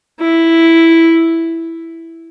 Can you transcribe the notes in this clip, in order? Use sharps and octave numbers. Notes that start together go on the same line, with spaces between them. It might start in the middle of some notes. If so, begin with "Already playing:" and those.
E4